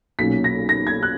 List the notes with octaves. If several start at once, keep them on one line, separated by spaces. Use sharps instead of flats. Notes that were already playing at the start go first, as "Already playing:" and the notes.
B1 A#2 F#3 A#3 C#4 B6
A#6
A#6
G#6
F#6